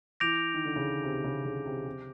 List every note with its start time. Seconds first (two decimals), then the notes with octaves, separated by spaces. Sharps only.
0.20 E3 D6 G6 A#6 D7 F7
0.54 D#3
0.65 D3
0.76 C#3
1.03 C3
1.24 C#3
1.45 C#3
1.66 C3
1.86 C3